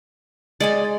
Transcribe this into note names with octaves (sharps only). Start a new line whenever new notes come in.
G#3 D5 D#5 G#5